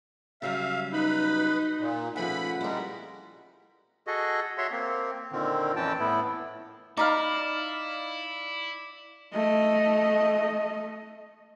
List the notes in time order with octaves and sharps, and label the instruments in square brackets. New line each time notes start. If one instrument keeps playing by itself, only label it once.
[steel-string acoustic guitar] C#3 F#3 G3 [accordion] E5 F5
[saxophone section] D#4 [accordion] B4 B5
[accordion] A#2
[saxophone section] C#3 A3 F#5 [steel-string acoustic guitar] F3 B4 G#5 [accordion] B5
[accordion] G3 G#3 [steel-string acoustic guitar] E4 A#4
[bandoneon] F#4 G#4 A4 D#5
F#4 C#5 E5 C6
A#3 C4
A#2 D3 D#3 C4
F2 A#2 E3 C#4 G5 A5
A2 B3 E4
[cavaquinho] D#4 B5 [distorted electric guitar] E4 [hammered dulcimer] D5 F5
[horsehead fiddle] A3 D#5